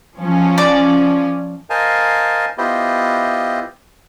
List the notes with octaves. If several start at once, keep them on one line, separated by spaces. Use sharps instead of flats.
F3 C#4
D5
A#4 C5 D#5 F5 G#5 A5
B3 E4 F4 G4 C5 D#5